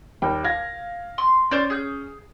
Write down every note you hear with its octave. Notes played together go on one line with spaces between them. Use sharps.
D#2 G3 G5
F5 G#6 A#6
C6
C#4 C5 D5
G#4 G6